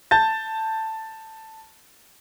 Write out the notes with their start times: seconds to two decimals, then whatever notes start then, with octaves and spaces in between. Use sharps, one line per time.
0.11 A5 G6 A6